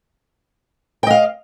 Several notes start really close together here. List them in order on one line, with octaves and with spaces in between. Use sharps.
G5 D#5 F5